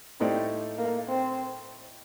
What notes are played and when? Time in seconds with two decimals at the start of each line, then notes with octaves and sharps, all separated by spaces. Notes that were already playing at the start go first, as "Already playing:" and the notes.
0.20 A2 A3 C4 D#4 G4 D5
0.78 A#3
1.08 C4